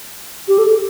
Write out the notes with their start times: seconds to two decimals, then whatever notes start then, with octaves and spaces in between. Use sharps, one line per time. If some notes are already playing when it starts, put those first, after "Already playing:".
0.48 G4
0.58 A4